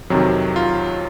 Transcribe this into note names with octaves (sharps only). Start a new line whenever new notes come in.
F2 C3 D#3 F#3
F4